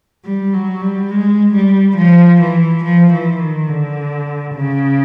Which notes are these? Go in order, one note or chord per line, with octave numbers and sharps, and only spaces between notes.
G3
F#3
G3
G#3
G3
F3
E3
F3
E3
D#3
D3
C#3